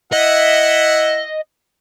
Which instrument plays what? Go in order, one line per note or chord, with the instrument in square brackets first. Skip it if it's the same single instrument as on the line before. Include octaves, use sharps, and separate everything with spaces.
[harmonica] E4 E5 F#5 [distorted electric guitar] D#5